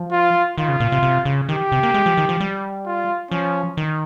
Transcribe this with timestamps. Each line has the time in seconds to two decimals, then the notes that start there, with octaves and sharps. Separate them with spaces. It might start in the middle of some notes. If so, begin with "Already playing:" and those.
Already playing: F3
0.11 F4
0.58 D#3 F4
0.68 C#3
0.80 A#2
0.92 C3
1.03 C3
1.25 C#3
1.49 D#3 G4
1.72 C3
1.83 A#3
1.94 G#3
2.06 F3
2.17 D#3
2.29 F3
2.40 G3
2.86 F4
3.31 F3 C#4
3.77 D#3